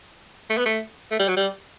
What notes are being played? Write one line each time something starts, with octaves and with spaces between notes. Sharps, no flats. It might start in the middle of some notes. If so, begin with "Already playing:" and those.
A3
B3
A3
A3
G3
F#3
G3